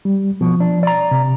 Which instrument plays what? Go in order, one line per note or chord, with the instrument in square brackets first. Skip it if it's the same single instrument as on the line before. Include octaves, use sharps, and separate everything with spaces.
[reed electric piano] G3
[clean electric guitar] B2 [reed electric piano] F3
[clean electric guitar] D4
D5 A#5
[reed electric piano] C3